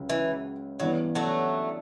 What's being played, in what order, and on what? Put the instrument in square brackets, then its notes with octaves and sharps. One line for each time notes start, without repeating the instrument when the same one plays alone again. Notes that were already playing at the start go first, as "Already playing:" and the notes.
Already playing: [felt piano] C#2 C#3 F#3
[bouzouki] E3
[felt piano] G2 E3 B3 [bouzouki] F#3
[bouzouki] F#3 A3